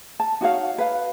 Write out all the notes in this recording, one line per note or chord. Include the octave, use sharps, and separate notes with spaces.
A5
D#4 F#4 C#5 F5
B4 F5